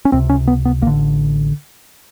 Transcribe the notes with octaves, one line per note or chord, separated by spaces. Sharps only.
C#4
C#2 C3 C4
C#4
B3
B3
A1 A#3
D3